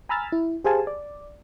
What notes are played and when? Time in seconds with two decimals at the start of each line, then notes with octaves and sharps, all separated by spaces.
0.09 G#5 A#5 B5 E6 F6 A6
0.32 E4
0.64 G4 G#4 C5 F5 G#5 A5
0.87 D5